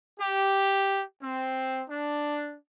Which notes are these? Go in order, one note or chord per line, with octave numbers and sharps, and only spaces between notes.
G4
C4
D4